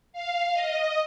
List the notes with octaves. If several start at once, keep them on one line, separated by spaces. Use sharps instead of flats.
F5
D#5